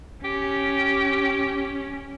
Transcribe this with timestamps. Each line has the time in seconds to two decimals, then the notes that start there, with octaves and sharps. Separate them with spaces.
0.24 C#4 G4